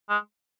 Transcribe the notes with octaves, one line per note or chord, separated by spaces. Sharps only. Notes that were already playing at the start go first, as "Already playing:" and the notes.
G#3